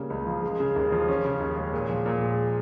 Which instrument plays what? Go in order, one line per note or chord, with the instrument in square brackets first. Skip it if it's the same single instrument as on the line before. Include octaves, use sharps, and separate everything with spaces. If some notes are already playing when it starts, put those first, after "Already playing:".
Already playing: [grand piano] C#3 G3 A#3
C#2
F3
G#3
C#3
D#2
F3
C#4
C#3
D#2
G#3
A#2
F3
A#2
G#3